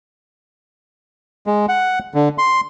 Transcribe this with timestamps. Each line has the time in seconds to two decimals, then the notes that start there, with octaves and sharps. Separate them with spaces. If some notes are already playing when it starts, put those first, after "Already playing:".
1.47 G#3
1.69 F#5
2.14 D3
2.38 C6